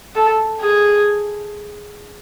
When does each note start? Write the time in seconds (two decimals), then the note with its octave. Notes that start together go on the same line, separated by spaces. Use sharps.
0.15 A4
0.60 G#4